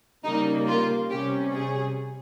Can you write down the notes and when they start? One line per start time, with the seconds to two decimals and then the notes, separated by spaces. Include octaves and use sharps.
0.24 C#3 G3 A#3 D#4
0.67 F4
1.10 C3 G3 C#4 G4
1.53 G#4